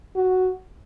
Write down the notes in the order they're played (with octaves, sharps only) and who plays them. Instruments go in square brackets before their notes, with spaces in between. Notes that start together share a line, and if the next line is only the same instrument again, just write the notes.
[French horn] F#4